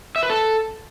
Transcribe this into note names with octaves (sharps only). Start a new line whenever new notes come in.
E5
B4
A4